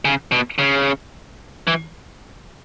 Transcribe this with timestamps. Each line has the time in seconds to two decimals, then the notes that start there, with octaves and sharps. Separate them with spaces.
0.05 C#3
0.32 B2
0.59 C#3
1.67 E3